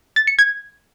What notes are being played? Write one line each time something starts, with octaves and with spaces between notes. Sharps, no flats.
A6
C#7
G#6